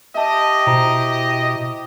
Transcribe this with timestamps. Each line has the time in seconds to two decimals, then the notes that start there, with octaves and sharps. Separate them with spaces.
0.15 G4 D#5 E5 A5
0.67 B2 E4 C5 A#5
1.31 D#6